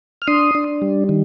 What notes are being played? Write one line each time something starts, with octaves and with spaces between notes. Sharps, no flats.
F6
D4 C6 D#6
D4
G3
D#3